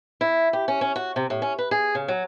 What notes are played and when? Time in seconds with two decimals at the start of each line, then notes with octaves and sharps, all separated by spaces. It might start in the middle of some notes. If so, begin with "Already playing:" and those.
0.21 E4
0.53 G4
0.68 C#4
0.81 C#4
0.96 F#4
1.16 C3
1.30 A2
1.42 C#4
1.59 B4
1.71 G#4
1.95 C#3
2.08 F#3